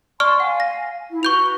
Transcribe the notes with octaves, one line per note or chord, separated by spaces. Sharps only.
D5 A5 C6 C#6 F6
F5 F#5 G#5
A#6
E4
F#4 B4 C#6 G6 F7